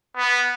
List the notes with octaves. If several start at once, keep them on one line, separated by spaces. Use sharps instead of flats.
B3